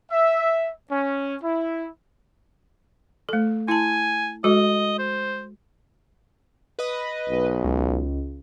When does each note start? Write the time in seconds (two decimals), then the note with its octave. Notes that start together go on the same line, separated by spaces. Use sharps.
0.11 E5
0.90 C#4
1.42 E4
3.29 A3 A4
3.68 E4 G#5 A5
4.44 G#3 F#4 A4 D#5
4.99 C5
6.79 B4 D#5
7.29 B1
7.64 C#2